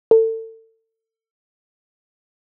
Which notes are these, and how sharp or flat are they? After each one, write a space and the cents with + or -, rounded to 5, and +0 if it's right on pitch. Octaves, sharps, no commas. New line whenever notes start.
A4 +30